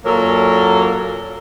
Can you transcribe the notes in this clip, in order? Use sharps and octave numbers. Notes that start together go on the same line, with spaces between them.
F#2 A#2 F#3 A#3 A4 A#4